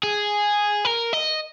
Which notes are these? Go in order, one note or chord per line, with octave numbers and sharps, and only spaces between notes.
G#4
A#4
D#5